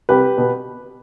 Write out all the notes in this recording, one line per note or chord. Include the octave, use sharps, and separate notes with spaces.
C2 G4 B4
B2 B3